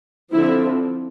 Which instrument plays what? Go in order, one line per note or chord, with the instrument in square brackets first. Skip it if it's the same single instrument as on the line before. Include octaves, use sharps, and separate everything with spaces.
[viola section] D3 F3 C4 E4